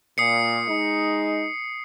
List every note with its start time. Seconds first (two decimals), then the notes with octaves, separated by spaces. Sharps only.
0.18 A#2 D#6 C7 C#7
0.69 G#3 D#4